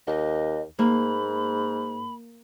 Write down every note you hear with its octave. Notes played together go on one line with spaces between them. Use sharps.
D#2 D#5
G#2 A#3 B5